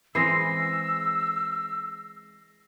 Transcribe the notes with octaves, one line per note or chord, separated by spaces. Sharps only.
E3 G#3 C4 E6 A#6 C7